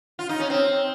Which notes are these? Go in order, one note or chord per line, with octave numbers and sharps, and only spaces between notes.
F4
D#4
C#4
C4